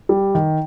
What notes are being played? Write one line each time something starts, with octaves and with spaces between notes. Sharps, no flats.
G3
D#3